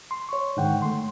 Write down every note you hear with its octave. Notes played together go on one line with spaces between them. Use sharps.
C6
C#5 C#6
G#2 D3 D#3 F#5 G5
A3 C6